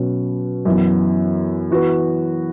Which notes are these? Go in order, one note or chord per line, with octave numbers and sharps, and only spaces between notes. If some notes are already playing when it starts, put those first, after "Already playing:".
Already playing: B2 F#3 C#4
F#2 E3 B3
E3 B3 F#4 B4